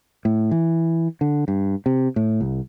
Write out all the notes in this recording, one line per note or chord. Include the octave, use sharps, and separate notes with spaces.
A2
E3
D3
G2
C3
A2
C2